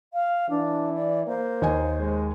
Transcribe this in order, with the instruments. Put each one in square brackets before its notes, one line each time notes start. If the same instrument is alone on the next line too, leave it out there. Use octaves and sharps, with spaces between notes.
[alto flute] F5
[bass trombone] E3 [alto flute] D4
[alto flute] D5
[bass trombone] A#3 [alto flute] C5
[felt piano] D#2 D#5 G#5
[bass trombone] G#3